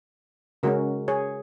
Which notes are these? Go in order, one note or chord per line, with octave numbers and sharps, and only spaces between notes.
C#3 G#3 C#4 F#4 A#4
G#4 C#5